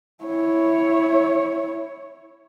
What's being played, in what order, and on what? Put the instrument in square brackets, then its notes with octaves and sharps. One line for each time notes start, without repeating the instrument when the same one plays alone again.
[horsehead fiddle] E4 C#5